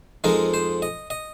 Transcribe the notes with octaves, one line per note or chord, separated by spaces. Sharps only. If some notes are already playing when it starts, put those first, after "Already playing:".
F2 F3 G#3 D#4 A#4
C5
D#5
D#5